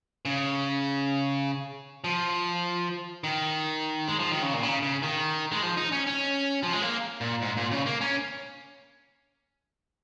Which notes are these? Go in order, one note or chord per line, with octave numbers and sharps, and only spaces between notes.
C#3
F3
D#3
G#3
F3
D#3
C#3
A#2
C#3
C#3
D#3
G#3
F3
D#4
C#4
C#4
F3
G#3
A#3
A#2
G#2
A#2
C#3
A#3
C#4